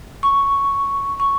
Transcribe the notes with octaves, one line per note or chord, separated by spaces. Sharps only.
C#6
C#6